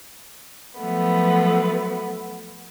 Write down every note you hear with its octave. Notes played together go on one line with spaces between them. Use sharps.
F3 F#3 A3 B3 B4